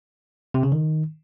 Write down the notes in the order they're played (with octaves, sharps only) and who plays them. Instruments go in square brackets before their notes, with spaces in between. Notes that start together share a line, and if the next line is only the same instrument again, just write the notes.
[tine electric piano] C3
C#3
D#3